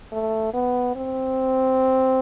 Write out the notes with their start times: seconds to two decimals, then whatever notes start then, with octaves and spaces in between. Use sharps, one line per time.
0.12 A3
0.54 B3
0.96 C4